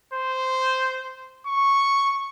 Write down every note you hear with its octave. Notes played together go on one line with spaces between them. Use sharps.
C5
C#6